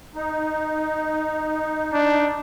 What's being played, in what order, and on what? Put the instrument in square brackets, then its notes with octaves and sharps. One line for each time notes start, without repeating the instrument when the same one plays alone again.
[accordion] D#4
[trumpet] D4